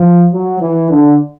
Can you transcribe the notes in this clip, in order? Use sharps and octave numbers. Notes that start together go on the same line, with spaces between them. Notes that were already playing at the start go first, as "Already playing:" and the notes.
Already playing: F3
F#3
E3
D3